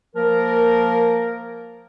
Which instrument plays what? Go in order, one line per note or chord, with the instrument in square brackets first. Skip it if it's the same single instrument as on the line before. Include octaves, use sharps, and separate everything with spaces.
[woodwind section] F3 A#3 A#4